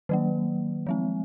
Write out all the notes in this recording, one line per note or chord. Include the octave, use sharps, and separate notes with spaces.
D#3 F#3 A#3
F3 G#3 C4